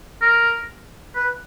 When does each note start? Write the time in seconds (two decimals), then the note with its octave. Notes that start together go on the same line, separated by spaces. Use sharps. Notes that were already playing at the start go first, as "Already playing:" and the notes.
0.21 A#4
1.15 B4